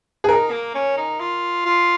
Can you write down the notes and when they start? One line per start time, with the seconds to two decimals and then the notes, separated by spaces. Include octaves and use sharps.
0.24 G#4
0.28 D#4 A#4
0.51 A#3
0.75 C#4
0.97 D#4
1.20 F4
1.65 F4